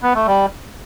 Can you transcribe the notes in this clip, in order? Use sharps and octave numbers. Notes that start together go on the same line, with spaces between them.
B3
A3
G3